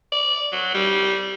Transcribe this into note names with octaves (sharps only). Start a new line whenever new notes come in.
D5
F#3
G3